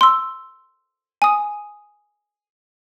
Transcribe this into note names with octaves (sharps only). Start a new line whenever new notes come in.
C6 E6
G#5 D#6